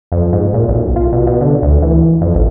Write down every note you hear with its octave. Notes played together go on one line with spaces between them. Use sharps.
F2
G#2
A#2
B1
F4
B2
B2
D3
D2
E3
F2
A1